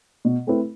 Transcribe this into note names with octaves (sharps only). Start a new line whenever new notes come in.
B2
A3 C4 E4 B4